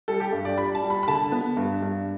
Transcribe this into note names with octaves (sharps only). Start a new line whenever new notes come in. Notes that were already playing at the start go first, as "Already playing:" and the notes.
G3 A4
G4
G2
D5
G3 B5
A5
G3
B5
B5
D3 A5
B3
G2
G2